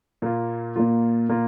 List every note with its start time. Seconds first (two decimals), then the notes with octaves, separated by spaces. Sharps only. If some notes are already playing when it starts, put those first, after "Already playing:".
0.22 A#2 A#3 F4
0.76 A#2 A#3 F4
1.29 A#2 A#3 F4